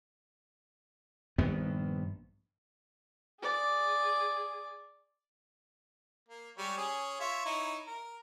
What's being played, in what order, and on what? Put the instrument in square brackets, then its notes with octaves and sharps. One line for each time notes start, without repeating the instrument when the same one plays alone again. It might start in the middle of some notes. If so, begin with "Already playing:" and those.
[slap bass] A#1 G2 D#3 B3
[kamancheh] G#4 D5
[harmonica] A#3
G3 G#3 C#5
C#4 G#4
F4 C#5 E5
D#4 E4 C#5
A#4